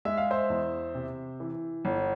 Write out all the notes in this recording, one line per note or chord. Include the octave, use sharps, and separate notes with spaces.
G#3 E5
F5
C5 E5
E2
C3
E3
G1